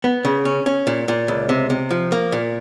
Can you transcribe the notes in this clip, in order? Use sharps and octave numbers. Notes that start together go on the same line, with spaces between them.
B3
C#3
C#4
C#4
A#2
A#2
C#2
C3
C3
F3
A#3
A#2